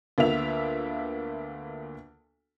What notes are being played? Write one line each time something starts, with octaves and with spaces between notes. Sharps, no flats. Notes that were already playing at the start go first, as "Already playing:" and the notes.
D2 A#3 B3 F4 E5 F7